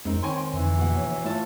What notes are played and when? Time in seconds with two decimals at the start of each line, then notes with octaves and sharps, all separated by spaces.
0.05 F2 G#3 C4 C#4 D#4 A#4
0.23 D#3 C#5 G5 G#5 C6
0.54 F2 D3 E3
0.78 A#1 B2 F#5 G5
0.95 C#5
1.24 A2 A3 F4 A5